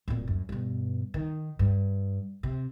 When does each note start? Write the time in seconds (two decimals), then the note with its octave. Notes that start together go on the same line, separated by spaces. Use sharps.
0.08 D1 A#2
0.28 F#2
0.49 G2 B2
1.14 D#3
1.59 G2
2.43 C3